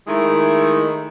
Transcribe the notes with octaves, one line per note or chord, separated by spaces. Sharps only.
D#3 G#3 A3 E4